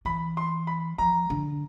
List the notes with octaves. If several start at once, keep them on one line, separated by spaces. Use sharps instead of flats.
E3 B5
C6
B5
F3 A#5
D3